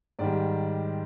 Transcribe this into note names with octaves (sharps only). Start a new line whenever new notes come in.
G#2 D#3 G3 D5